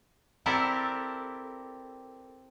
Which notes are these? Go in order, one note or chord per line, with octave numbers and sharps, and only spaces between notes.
C4 E4 G4 A4 A#4 D5